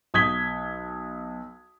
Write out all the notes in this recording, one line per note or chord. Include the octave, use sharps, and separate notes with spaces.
B1 D#6 G#6 B6 G7